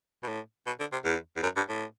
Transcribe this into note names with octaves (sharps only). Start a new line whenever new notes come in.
B2
A2
B2
D3
C3
E2
E2
F#2
G2
A2